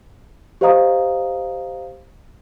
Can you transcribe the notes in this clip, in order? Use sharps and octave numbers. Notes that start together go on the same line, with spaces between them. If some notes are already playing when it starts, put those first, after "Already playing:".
G4 C5 D#5 F5 A#5 D#6